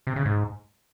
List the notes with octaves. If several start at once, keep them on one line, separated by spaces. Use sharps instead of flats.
C3
C#3
G#2